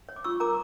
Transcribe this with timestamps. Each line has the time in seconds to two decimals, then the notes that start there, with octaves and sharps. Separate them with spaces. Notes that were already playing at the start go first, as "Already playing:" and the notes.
0.09 C#5
0.16 D6
0.24 F4 C#6 E6
0.40 A#4 A#5 D6